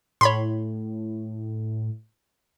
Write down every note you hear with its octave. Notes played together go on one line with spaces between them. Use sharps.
A2 C#5 B5 C6